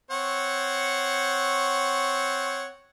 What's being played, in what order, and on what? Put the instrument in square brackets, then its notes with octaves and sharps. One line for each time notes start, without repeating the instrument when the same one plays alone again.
[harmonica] C4 C#5 F#5